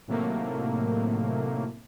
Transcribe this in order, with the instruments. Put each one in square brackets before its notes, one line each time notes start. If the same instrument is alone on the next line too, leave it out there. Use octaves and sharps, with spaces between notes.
[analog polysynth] A2 C3 D#3 F#3 A3 A#3